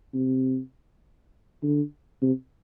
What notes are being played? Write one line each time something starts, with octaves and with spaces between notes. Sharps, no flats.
C3
D3
C3